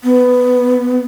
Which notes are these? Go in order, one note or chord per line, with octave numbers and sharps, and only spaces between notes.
B3